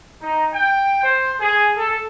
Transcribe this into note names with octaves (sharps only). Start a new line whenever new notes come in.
D#4
G5
C5
G#4
A4